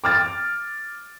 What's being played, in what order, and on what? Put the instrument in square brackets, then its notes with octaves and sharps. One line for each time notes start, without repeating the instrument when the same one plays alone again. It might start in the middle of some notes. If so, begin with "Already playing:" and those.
[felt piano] D6 F6 A6